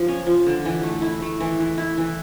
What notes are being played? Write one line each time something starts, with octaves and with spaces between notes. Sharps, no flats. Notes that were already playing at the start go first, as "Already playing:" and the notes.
Already playing: F3
C#4
F3
D3
E3
A3
E4
A3
E3
E3
E4
E3